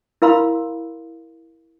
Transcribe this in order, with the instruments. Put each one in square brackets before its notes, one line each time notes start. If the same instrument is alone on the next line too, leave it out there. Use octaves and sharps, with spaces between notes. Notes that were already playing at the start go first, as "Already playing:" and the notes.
[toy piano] E4 A#4 F5 B5 C6 E6